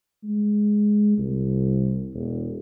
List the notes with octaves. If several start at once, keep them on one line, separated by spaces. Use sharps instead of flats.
G#3
C2
E1